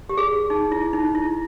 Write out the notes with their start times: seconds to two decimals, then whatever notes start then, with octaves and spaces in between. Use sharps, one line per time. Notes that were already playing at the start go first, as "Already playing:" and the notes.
0.09 G4
0.17 G#4
0.50 D#4
0.72 E4
0.93 D#4
1.15 E4